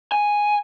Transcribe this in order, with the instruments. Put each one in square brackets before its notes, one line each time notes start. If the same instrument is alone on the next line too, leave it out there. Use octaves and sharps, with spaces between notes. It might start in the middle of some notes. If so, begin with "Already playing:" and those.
[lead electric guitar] G#5